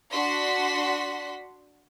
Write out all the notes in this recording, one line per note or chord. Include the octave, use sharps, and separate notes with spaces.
D4 F#4 F#5 C6 B6